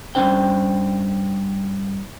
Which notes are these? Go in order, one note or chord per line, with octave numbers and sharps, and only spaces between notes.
G2 A3 C#4 D4 C5 G5